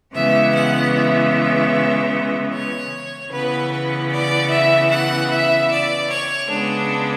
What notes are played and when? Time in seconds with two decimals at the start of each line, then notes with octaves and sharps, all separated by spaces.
0.14 C#3 E3 G#3 B3 E5
0.53 F#5
0.93 E5
2.52 C#5
3.31 C#3 E3 B3 B4
3.71 B4
4.11 D5
4.50 E5
4.90 F#5
5.30 E5
5.70 D5
6.09 C#5
6.49 C#3 G#3 B3 D4